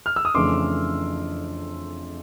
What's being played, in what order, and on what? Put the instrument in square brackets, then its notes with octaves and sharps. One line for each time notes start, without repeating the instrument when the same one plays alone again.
[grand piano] F6
E6
D#6
F2 C#3 E3 A3 D4 C6 D6